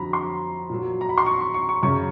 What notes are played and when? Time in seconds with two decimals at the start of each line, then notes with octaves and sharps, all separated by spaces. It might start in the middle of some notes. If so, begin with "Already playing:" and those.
Already playing: F2 D3 F#3 A#5 B5
0.13 C6
0.70 A#2 F#3
1.01 A#5
1.09 B5
1.18 C6
1.26 C#6
1.41 C#6
1.54 C#6
1.69 C#6
1.82 F#2 C#3 F#3 C#6